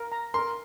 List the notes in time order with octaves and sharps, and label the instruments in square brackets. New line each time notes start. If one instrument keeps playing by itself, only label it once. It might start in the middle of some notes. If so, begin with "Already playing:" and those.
Already playing: [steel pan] A#4
A#5
[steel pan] A#4 [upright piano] C6